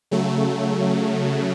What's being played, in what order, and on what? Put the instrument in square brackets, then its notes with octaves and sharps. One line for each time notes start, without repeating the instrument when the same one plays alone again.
[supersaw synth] C#3 F#3 A3